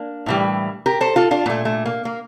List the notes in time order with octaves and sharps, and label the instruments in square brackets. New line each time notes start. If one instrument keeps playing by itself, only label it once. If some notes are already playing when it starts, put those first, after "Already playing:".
Already playing: [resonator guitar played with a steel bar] A#3 D4
A2 E3 G3
G4 A#4
A4 C5
F4 A4
D4 F4
A#2 A3 A#3
A3
A#3
A#3